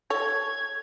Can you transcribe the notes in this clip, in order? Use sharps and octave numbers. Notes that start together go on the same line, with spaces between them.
A4 C#5 G#6